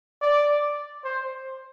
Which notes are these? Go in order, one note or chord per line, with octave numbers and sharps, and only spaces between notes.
D5
C5